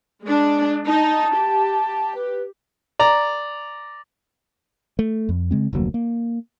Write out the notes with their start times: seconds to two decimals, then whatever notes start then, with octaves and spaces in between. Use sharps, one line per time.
0.23 G#3 D4
0.86 D#4 A5
1.37 G4
2.15 B4
2.99 D5 A#5
4.99 A3
5.29 F2
5.51 C#3 G#3 C4
5.73 F1 D2 F#3 A#3
5.94 A#3